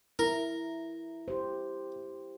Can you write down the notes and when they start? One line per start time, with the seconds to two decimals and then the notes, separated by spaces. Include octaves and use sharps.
0.19 E4 A#4
1.28 G4 C5